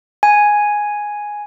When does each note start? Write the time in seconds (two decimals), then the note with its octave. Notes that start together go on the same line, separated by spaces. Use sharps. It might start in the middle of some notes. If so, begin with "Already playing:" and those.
0.23 G#5